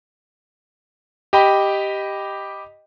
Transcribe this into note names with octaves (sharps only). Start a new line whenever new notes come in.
G4 D#5 G5 B5